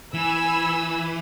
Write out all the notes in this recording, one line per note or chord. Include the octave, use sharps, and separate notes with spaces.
E3 G#5 B5 E6